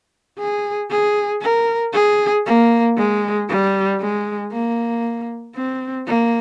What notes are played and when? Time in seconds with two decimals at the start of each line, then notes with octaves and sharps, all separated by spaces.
0.38 G#4
0.90 G#4
1.42 A#4
1.93 G#4
2.46 A#3
2.97 G#3
3.49 G3
4.00 G#3
4.52 A#3
5.55 C4
6.07 A#3